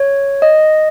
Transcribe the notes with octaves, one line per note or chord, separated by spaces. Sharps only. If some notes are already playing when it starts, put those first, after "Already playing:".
Already playing: C#5
D#5